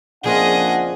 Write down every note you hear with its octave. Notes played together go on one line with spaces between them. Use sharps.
A#1 C#3 F3 C4 D4 G#4 D#5 F#5